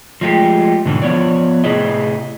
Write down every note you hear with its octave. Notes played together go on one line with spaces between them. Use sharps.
F3 G#3 A3 G4
G#2 B2 D3 E3
F3 B3 C#5 D5
A2 C3 E4 G#4 B4 D#5